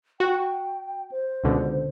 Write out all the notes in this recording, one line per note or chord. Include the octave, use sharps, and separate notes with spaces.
F#4 G5
C5
C#2 B2 D3